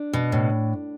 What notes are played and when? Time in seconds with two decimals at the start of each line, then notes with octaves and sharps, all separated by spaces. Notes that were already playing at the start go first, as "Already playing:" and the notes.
Already playing: D4
0.13 B2
0.32 A2